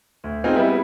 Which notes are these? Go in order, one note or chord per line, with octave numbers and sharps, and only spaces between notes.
D2
B3 C4 D#4 F4 G#4
G3 B3 E4